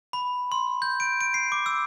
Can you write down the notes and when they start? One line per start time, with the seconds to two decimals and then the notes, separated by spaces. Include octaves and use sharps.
0.13 B5
0.52 C6
0.82 G6
1.00 D7
1.21 D7
1.34 C7
1.52 D6
1.66 E6